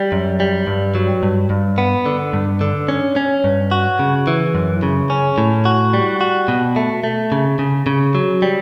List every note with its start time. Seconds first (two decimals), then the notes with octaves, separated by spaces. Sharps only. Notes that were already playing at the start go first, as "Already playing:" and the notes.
Already playing: G3
0.12 F#2
0.40 G3
0.67 G2
0.95 F#3
1.23 G2
1.50 G2
1.78 B3
2.06 D3
2.33 G2
2.61 D3
2.88 C#4
3.16 C#4
3.44 G2
3.71 F#4
3.99 C#3
4.27 E3
4.55 F#2
4.83 C#3
5.10 C#4
5.38 A2
5.65 F#4
5.94 G3
6.21 F#4
6.48 B2
6.76 A3
7.04 A3
7.32 C#3
7.59 C#3
7.87 C#3
8.15 F#3
8.42 G3